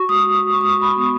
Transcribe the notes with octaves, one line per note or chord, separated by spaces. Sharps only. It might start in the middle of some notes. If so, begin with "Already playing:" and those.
Already playing: F#4 C#6
G#3 D#6
G#3 C#6
D#6
C#6
B5
B3